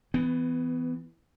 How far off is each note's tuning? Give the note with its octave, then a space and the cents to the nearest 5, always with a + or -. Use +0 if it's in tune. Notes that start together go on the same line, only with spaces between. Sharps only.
E3 +0 B3 +25